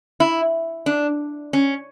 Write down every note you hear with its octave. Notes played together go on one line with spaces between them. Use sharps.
E4
D4
C#4